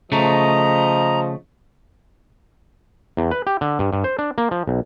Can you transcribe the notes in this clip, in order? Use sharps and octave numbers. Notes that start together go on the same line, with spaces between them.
C#3 F3 A3 D#5 A#5
E2
B4
G4
D3
G2
G2
C5
D4
A#3
F3
B1